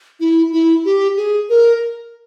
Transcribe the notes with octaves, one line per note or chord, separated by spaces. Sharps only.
E4
E4
G4
G#4
A#4